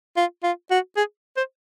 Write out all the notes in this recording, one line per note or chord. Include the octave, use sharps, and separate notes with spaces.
F4
F4
F#4
G#4
C5